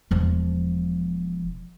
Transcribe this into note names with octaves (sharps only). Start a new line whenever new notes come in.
E1 F3